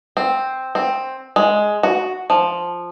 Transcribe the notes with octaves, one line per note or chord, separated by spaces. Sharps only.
C4
C4
G#3
F#4
F3